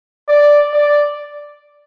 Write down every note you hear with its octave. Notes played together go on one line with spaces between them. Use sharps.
D5
D5